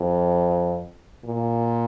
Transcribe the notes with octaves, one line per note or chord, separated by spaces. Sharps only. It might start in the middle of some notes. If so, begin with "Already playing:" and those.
Already playing: F2
A#2